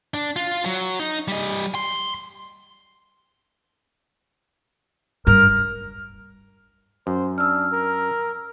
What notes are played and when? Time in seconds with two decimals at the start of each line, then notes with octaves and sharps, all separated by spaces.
0.14 D4
0.36 F4
0.65 F#3
1.00 D#4
1.28 G3 D#5
1.75 C6
5.27 G2 A#4
7.07 F#2 C5
7.38 D4 E6 F6
7.73 A#4